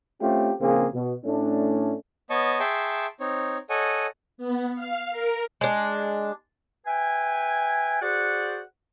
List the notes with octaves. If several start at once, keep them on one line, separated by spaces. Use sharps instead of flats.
A3 C4 C#4 F4 G4
A#1 C#3 A#3 C4 G#4
B2
A2 A3 C#4 D4
B3 C#5 D#5 A5 C#6
G#4 E5 G5 A5 C6 C#6
C4 D#4 C#5
A4 C#5 D#5 F#5 G#5
B3
F5
A#4
G#3 D4
B4 E5 G5 G#5
F#4 G#4 C5 D5 F#5